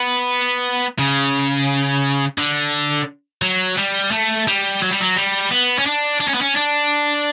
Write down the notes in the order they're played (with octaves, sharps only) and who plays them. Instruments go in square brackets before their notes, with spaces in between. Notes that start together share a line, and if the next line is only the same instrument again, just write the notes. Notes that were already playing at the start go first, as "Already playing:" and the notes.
Already playing: [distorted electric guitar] B3
C#3
D3
F#3
G3
A3
G3
F#3
G3
F#3
G3
B3
C#4
D4
D4
C#4
B3
C#4
D4